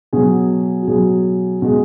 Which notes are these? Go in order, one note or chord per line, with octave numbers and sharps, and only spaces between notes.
B2 F#3 G#4
F#4
B2 F#3 G#4
B2 G#3